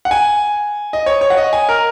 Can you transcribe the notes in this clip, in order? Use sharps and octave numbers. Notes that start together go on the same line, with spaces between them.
F#5
G#5
D#5
C#5
C#5
F#5
D#5
G#5
A#4